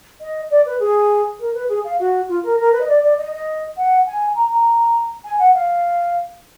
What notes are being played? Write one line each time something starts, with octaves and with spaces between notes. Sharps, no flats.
D#5
D5
B4
G#4
A#4
B4
G#4
F5
F#4
F4
A#4
A#4
B4
D#5
D5
D5
D#5
D#5
F#5
G#5
A#5
A#5
G#5
F#5
F5